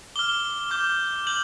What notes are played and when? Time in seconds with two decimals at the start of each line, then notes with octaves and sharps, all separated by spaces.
0.16 D6 F6 G7
0.71 D6 G6
1.27 G6 F#7